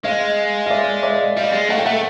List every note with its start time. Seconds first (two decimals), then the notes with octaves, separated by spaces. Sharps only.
0.04 G#3 D#5 F5
0.66 F5
0.70 D5 E5
1.03 D5 E5
1.36 G3 D#5 F5
1.53 G#3
1.70 A3 F#5
1.78 G5
1.85 A3 E5 F#5